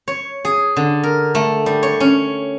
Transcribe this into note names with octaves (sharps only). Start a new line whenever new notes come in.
C#5
G#4
D3
A#4
A3
G3
C#5
C#4